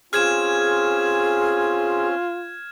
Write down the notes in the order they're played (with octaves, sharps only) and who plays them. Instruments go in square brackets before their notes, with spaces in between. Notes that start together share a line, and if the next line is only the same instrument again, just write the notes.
[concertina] C4 C#4 [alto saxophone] F4 [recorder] G#4 [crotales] F6 G#6 E7